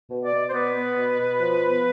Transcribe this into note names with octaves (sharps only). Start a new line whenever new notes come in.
B2
D5
B2
C5
B3 B4
B3
B2
B2
F3
B3